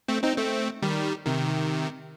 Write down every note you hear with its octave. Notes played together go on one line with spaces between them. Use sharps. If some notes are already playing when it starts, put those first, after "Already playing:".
A3 C4
C4 D#4
A3 C4
D#3 G3
C3 D#3